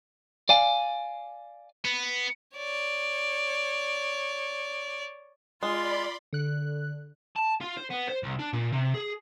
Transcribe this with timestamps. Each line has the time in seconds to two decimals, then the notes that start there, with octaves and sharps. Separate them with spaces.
0.49 D5 F5 G#5
1.85 B3
2.57 C#5 D5
5.63 G#3 F4 D5 B5 C6
6.33 D3 F#6
7.36 A5
7.61 F4
7.77 C5
7.91 B3
8.09 C5
8.24 C2
8.40 D4
8.53 A#2
8.72 C3
8.94 G#4